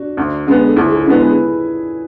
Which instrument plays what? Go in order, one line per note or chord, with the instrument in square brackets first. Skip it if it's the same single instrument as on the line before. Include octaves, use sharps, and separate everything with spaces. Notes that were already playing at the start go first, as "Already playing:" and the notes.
Already playing: [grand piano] D4 F#4
[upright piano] D2
D3 G#3 B3
[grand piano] A4
[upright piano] D2 [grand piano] E4 G#4
[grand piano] E4 G#4
[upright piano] D3 G#3 B3 [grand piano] E4 G#4
[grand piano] G#4 B4